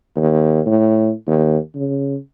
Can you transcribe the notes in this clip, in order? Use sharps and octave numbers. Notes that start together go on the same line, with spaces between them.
D#2
A2
D#2
C#3